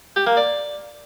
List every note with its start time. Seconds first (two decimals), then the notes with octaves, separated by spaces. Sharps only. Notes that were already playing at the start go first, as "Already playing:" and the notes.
0.16 G4
0.27 A#3
0.37 D5